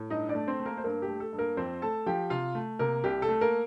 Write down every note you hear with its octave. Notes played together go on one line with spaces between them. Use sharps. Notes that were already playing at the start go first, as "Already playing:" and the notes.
Already playing: A2
G2 D#4 D#5
D4 D5
A3
C4 C5
A3
A#3 A#4
C5
G2 A#3 A#4
G4
A3
A4
G2
A#3 A#4
F2 C4 C5
A3 A4 A5
F3 G4 G5
C3 F4 F5
A3
C3 A#3 A#4
C2 G4
A4
A3
A#3 A#4